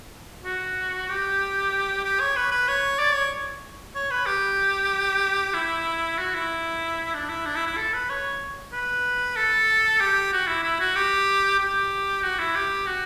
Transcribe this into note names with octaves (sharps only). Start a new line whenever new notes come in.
F#4
G4
G4
C#5
B4
B4
C#5
D5
C#5
C#5
B4
G4
E4
F#4
E4
D4
E4
D4
E4
E4
A4
B4
C#5
B4
A4
G4
F#4
E4
E4
F#4
G4
G4
F#4
E4
G4
F#4